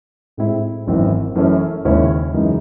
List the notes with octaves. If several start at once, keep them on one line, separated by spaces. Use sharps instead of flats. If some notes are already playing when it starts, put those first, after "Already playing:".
A2 G#3 C4 E4
G#1 F#2 E3 C4 E4
F#2 E3 A3 C#4
D#2 C#3 G#3 C#4 E4
F#2 C#3 E3 G#3 D#4